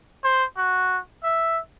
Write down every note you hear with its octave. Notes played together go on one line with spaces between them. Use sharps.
C5
F#4
E5